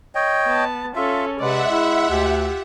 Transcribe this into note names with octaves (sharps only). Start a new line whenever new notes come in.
C#5 D#5 G5
B3 A5
C#4 F4 A4 E5
C3 G#3 B4 D5 E5 F#5
E4 G#4
D2 F4 G4